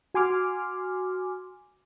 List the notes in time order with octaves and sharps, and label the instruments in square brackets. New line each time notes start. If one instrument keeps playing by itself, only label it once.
[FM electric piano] F#4 G#5 C6 D6 F6